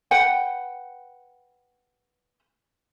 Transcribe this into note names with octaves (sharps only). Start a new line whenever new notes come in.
B4 F#5 G5